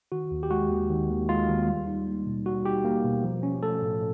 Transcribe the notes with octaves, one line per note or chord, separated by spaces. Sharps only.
D#3 F#4
D#2
G4
G#3 F#4
D#2
D#3
D#2
G#3 F4
D#2
G3
D#4
A#3
B2
G3 F#4
D#4 G4
A#3
B2
F3
C#4
A3 A4
A2